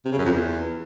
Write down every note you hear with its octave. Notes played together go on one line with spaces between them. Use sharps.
C3
C#3
F#2
F2
E2